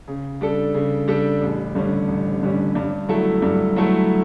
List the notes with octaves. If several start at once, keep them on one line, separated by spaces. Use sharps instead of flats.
C#3
G3 D4 A4
C#3
G3 D4 A4
A1
G2 D3 G3 C#4
A1
G2 D3 G3 C#4
G2
F#3 A3 E4 A4
G2
F#3 A3 E4 A4